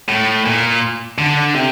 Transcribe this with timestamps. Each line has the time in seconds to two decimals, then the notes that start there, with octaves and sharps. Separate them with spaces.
0.09 A2
0.46 A#2
1.18 D3
1.55 C3